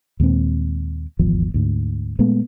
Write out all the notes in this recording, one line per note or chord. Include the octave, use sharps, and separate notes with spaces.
D#2 A#2 G#3 C4
D#1 G#1 E2 F3
D2 G#2
A#2 G#3 A3 B3